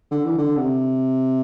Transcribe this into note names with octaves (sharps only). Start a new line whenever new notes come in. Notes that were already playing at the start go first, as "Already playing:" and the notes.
D3
E3
D3
C3